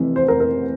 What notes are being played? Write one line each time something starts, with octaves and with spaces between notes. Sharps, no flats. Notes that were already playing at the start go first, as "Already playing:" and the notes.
Already playing: F1 F2 C3 E3
C5
A#4
A#4